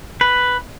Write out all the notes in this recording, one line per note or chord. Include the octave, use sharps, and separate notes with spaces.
B4